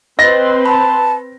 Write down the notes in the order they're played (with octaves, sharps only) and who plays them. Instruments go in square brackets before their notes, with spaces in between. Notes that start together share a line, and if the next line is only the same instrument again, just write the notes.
[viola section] C4 B4 C6 [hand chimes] D#5 [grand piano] A6 A#6
[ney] A5 [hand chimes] B5